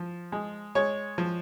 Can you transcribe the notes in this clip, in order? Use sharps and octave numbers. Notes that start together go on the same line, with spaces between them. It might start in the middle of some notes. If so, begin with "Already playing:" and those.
Already playing: F3
G#3
G#3 C#5
F3